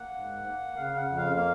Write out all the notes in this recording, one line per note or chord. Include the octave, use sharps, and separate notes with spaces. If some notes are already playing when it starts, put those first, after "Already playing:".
Already playing: A#3 F#5
G#2
A#3
C#3 F5
F#5
F2
F5
A#3 F5